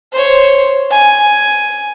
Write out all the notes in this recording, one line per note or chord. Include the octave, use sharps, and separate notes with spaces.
C5 C#5
G#5